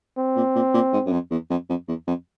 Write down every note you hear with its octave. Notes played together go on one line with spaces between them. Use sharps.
C4
A#2
A#2
A#2
G#2
F#2
F2
E2
F2
F2
E2
F2